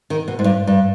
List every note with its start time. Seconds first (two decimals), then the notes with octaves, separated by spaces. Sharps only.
0.10 D#3
0.28 B2
0.39 G#2
0.44 G2
0.67 G2